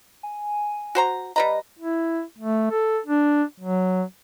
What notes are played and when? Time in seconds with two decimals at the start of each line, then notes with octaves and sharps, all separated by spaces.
0.23 G#5
0.95 F#4 C5 A#5
1.36 G3 B4 D#5 A#5
1.79 E4
2.38 A3
2.71 A4
3.06 D4
3.60 F#3